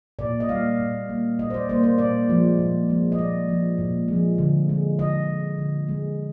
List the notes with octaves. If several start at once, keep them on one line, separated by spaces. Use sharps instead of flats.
A#2 D5
D#5
G3 A#3 F5
A#2
G3 A#3
A#2 D#5
C5
D5
G3 A#3 C5
C5
A#2 D5
F3 G#3
A#2
F3 G#3
D#5
A#2 D5
F3 G#3
A#2
F3 G#3
D3
G#3
D3 D#5
G#3
D3
G#3